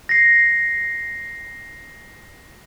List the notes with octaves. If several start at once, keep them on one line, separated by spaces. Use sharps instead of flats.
A#6 C7